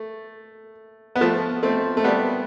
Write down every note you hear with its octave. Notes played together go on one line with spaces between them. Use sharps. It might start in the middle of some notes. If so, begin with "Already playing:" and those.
Already playing: A3
B3
F3 A3
A3 C4
A3
G3 B3